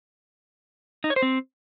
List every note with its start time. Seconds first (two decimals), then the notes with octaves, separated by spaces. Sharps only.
1.04 D#4
1.10 C#5
1.16 C5
1.22 C4